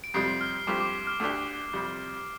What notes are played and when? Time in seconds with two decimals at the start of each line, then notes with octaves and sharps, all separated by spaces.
0.04 D7
0.14 F2 C3 G3 C7
0.41 F6
0.67 G2 F3 A3 C4 G4 D6
0.80 D6
1.07 F6
1.20 D2 D3 A3 D4 G4
1.73 F2 C3 G3